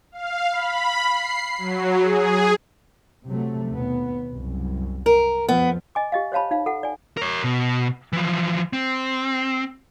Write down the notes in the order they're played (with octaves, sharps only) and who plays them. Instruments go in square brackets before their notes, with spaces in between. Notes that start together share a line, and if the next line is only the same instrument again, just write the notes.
[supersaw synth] F5
B5
C7
F#3
G#4
[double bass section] C3 F#3 A3
D#2 B2 B3
C2 F#2
[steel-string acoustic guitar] A#4
[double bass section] F2 F3 [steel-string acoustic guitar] B3
[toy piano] D#5 G#5 D6
G4 D#5 F5
C5 C#5 F5 A5 B5
D#4 F5
A4 F#5
D5 G#5
[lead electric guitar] A#4 C#5
B2
E3 F3
C4